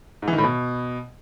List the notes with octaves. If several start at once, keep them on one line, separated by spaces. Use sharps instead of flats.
G#2
E3
D#3
A2
B2